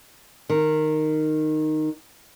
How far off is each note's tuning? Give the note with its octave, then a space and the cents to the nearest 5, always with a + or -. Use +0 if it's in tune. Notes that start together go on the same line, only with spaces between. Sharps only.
D#3 -10